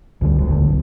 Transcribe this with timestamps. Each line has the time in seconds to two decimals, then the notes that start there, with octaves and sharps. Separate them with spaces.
0.21 C#2 D3 D#3 G3
0.35 D#1 D2
0.48 G1 D2 D3
0.66 B1